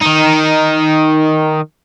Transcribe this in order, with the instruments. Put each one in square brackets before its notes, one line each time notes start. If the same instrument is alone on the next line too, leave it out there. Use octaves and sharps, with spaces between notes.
[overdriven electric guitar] D#3 D#4